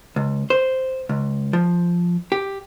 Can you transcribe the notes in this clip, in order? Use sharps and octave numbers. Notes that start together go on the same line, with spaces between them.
C#2
C5
C#2
F3
G4